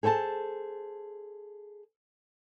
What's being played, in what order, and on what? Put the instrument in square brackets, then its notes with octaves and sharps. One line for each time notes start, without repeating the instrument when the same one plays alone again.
[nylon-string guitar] G#4 A4 C5 G#5 A5